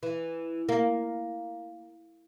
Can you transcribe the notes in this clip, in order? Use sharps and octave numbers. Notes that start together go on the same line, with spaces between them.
E3
A#3